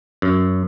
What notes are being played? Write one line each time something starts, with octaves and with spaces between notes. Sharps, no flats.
F#2